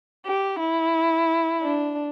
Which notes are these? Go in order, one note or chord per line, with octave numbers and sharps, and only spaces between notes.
G4
E4
D4